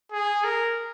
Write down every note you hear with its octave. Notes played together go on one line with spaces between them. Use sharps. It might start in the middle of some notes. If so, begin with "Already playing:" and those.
G#4
A#4